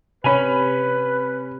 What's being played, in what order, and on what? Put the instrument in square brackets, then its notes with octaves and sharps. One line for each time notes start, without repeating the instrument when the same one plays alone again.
[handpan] C3 [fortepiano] C#4 G#5 [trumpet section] B4 [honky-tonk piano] B5 D#7 F7